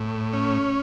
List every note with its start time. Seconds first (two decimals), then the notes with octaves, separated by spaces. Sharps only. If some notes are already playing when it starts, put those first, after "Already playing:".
Already playing: A2
0.33 C#4